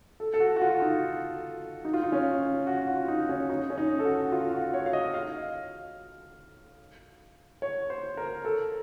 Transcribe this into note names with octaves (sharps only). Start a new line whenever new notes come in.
A4
A4
F#4
F#4
F4
D#4
D#4
F4
D#4
C#4
F#4
F4
D#4
C#4
D#4
C#4
D#4
A4
F#4
F4
F#4
C#5
F5
D#5
F5
C#5
C5
A#4
A4